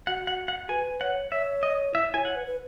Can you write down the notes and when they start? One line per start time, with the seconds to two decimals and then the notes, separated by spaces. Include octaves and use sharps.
0.07 F#4 F#5
0.27 F#5
0.48 F#5
0.69 B4 G#5
1.00 C#5 F#5
1.31 C#5 E5
1.63 D#5
1.94 E4 E5
2.14 C#5 G#5
2.25 F#5
2.36 B4
2.47 B4